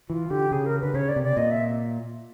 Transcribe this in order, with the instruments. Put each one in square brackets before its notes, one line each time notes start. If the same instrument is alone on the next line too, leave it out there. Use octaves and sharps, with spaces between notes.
[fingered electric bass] E3 [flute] F4
[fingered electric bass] D3 [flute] G4
[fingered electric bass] C#3 [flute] G#4
[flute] A#4
[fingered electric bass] D3 [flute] B4
[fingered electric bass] C#3 [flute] C#5
[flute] D5
[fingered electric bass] C3
[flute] D5
[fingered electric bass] A#2 [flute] D#5
[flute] E5